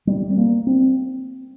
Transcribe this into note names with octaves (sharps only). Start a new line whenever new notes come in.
G3
C4
A#3
C4